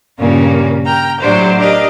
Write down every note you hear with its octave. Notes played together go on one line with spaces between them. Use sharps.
G2 A#2 C#3 A#3 C#4 F4
G5 A#5 F6
A2 F#3 D4 G4 C5
D4 G4 A#4 D#5 F5